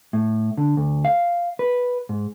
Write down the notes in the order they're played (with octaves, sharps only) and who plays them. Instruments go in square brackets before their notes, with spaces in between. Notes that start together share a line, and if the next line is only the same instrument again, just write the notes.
[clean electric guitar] A2
D3
D2
F5
B4
G#2